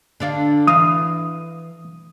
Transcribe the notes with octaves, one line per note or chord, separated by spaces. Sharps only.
D3 D4 F5
E3 F5 D#6